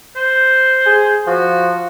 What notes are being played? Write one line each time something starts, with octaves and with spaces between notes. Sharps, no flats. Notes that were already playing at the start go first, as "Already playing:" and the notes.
C5
G#4
F3 F#4